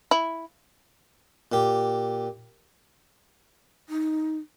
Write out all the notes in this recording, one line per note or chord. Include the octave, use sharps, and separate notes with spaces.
E4
A#2 G4
D#4